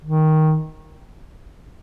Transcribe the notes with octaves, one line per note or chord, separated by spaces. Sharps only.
D#3